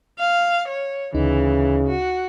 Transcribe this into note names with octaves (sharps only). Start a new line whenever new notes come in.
F5
C#5
D2 C#3 E3 D#4
F#4